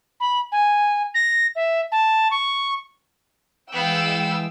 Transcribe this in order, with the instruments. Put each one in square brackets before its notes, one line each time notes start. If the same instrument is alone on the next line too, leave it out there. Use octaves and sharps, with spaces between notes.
[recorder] B5
G#5
A#6
E5
A5
C#6
[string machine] E3 G#3 [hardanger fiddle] B3 F5 [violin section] G5 E6